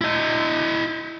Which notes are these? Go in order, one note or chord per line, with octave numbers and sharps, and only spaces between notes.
E4 D#5